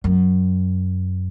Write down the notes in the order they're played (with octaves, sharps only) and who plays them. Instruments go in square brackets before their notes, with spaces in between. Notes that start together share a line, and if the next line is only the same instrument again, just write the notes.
[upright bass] F#2